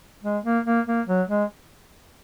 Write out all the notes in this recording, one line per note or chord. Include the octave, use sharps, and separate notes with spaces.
G#3
A#3
A#3
A#3
F#3
G#3